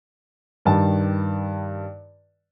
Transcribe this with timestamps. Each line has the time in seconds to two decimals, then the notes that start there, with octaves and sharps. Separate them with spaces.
0.65 G2 D#3 G3 A5